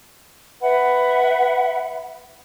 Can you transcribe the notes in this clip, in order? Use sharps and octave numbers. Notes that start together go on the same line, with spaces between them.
B4 E5 F#5 B5